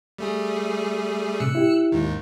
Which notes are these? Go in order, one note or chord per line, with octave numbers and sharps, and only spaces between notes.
G3 A3 G#4
A2 C3 E6 F#6 C#7
E4 G4
D#2 G#2 D#3